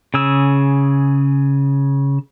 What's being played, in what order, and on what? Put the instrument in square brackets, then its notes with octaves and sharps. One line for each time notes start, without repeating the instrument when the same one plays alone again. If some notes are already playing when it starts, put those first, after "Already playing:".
[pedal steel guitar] C#3 G#4 E6